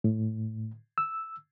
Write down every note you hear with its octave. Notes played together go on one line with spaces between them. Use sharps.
A2
E6